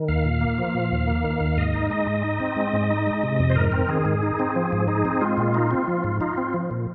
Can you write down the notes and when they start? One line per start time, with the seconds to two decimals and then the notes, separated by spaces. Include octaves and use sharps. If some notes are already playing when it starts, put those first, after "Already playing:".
Already playing: D#3
0.08 D#2 F5
0.25 A#2
0.41 A#3
0.58 F3
0.75 A#2
0.92 D#2
1.07 A#3
1.24 D#3
1.40 D#2
1.57 G#2 D#5
1.74 D#4
1.90 G#3 D#5
2.07 G#2
2.24 D#4
2.40 C4
2.56 G#3
2.73 G#2
2.90 D#4
3.07 G#3
3.23 C3
3.39 F2
3.50 C5
3.56 G#2 A#4
3.72 C4
3.89 D#3 G#4
4.05 G#2
4.23 D#4
4.39 C4
4.56 F3
4.72 G#2
4.88 D#4 G#4
5.05 C4
5.21 G#3 F4
5.38 A#2
5.54 D#4
5.71 C4
5.88 F3
6.04 G#2
6.21 D#4 F4
6.38 C4
6.54 F3
6.71 A#2